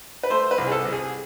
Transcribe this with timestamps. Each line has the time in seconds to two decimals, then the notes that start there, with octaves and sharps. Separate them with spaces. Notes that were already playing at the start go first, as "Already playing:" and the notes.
0.23 B4
0.30 A3 C5
0.51 B4
0.58 C2
0.67 G#4
0.72 A4
0.85 C2
0.92 G#4